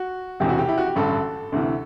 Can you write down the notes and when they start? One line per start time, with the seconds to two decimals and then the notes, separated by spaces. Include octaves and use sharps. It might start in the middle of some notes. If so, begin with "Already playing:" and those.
Already playing: F#4
0.40 E1 E2 C3 G4
0.49 F#4
0.58 G4
0.69 E4
0.78 F#4
0.86 G4
0.96 A1 G2 D3 A4
1.52 D2 C3 E3